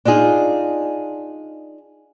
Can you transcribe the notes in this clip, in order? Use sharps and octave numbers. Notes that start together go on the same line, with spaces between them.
D4 D#4 F4 G#4